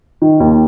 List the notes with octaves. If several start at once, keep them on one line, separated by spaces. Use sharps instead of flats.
D#3
D#2